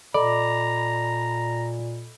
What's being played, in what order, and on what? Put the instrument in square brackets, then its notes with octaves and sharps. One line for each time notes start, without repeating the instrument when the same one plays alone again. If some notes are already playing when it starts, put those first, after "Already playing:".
[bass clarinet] A#2 [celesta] A4 D#5 B5 [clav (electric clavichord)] D5 [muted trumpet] A#5